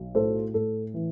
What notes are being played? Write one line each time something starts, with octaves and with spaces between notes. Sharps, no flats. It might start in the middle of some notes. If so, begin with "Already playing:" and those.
Already playing: B1
A2 A4 C5
A2 A4
E3